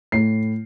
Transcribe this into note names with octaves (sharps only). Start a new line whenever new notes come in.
A2 C7